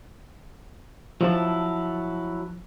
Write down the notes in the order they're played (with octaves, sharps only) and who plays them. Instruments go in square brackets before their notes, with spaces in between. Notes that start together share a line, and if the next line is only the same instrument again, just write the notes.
[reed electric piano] F3 [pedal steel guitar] F#3 E4 A5